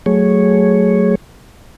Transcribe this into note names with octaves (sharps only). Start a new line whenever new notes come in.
F#3 A3 G#4 C#5